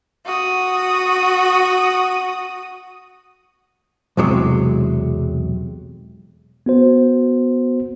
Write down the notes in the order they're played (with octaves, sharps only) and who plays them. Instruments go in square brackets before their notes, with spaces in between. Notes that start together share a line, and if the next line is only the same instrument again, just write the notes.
[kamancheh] F#4 D#6
[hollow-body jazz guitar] B1 E2 C3 F#3 G#3
[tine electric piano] B3 F#4 C5